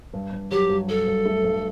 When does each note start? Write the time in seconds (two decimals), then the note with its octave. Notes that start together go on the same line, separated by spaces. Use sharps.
0.14 G2
0.33 G2
0.51 F#3 G4
0.69 G2
0.88 F#3 A4
1.07 G2
1.26 A3
1.44 G2